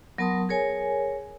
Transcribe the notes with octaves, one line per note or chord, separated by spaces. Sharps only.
F#3 B3 A#4 A5 C6 D#6
G#4 A#4 C#5 G#5